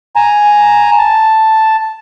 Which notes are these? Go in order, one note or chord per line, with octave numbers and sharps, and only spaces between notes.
G#5 A#5
A5